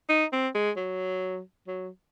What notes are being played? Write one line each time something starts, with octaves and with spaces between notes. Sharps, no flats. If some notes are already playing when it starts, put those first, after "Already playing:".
D#4
C4
G#3
F#3
F#3